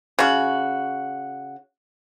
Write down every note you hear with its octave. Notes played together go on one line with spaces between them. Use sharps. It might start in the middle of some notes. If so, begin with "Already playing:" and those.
C#3 F#4